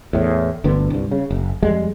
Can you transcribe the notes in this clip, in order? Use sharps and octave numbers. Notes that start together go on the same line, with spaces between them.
E2 A2
G1 D2 D3 B3
C2 G2
C#3
F#1
F2 G3 G#3